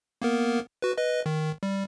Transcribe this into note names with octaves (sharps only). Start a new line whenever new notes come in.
A#3 B3 A#4
F#4 B4
B4 D#5
D#3
G3